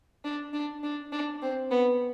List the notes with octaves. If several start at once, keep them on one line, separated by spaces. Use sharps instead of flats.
D4
D4
D4
D4
C4
B3